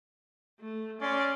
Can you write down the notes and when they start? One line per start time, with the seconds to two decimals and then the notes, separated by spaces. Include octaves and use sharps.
0.60 A3
1.01 C#4 D5 C6